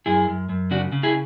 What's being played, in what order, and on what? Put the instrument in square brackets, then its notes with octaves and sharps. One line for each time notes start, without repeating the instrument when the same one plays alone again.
[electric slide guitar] F#2 E4 G#4
F#2
F#2
C#3 D4 F#4
C#3
E4 G#4